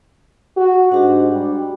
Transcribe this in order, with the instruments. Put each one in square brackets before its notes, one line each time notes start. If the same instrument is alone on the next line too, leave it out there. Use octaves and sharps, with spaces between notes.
[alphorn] F#4
[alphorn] G#2 [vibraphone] D4 F#4 G4
[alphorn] G3